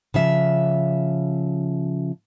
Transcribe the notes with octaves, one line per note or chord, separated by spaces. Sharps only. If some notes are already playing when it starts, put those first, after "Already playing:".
C#3 F3 E5